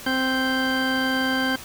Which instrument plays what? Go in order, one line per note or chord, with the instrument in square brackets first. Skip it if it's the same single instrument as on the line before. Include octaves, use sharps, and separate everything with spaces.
[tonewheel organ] C4 G6